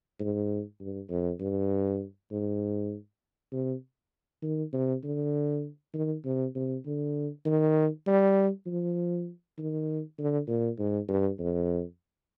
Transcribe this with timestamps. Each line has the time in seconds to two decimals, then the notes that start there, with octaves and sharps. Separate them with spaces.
0.19 G#2
0.80 G2
1.09 F2
1.40 G2
2.31 G#2
3.52 C3
4.42 D#3
4.73 C3
5.04 D3
5.94 D#3
6.24 C3
6.55 C3
6.86 D3
7.45 D#3
8.07 G3
8.66 F3
9.58 D#3
10.18 D3
10.48 A#2
10.78 G#2
11.08 G2
11.39 F2